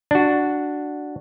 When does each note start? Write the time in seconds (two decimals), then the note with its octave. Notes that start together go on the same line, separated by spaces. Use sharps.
0.11 D4 F#4